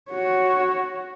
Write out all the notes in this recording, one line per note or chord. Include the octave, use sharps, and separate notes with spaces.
F#4 C#5